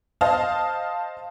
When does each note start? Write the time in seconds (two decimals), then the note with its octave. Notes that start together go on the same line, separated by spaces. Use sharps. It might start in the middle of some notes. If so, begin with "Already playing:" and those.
0.21 C5 D#5 F5 A5 D#6 F6